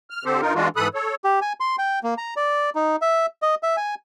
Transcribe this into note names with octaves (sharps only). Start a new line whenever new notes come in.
F6
D3 C4 G4 A4 C5
G2 D#4 F4 A#4
E3 G#3 D4 F4 F#4
G#2 E3 A4 B5 D#6 F#6
A4 C#5
G4
G#5
C6
G5
A#3
A#5
D5
D#4
E5
D#5
E5
G#5